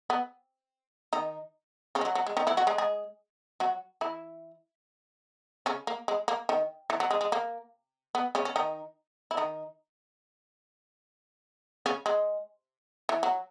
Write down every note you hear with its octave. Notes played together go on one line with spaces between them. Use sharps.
B3
D#3 D#4
C#3 C#4
G#3
F#3
F#3
G#3
D#3 D#4
E3 E4
F#3 F#4
G#3 G#4
G#3 G#4
F#3 F#4
E3 E4
C#3 C#4
A#3
G#3
A#3
D#3
E3
F#3
G#3
G#3
A#3
B3
C#3 C#4
C#4
D#3 D#4
E4
D#3 D#4
C#3 C#4
G#3
E3
F#3